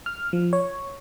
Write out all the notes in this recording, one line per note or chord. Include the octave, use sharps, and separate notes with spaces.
F6
F3
C#5